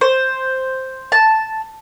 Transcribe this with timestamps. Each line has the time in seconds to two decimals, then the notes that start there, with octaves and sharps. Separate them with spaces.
0.01 C5
1.12 A5